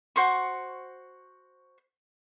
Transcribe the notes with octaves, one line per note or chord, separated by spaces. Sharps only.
F#4 C5 C#6